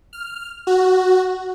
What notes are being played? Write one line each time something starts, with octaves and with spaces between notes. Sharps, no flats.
F6
F#4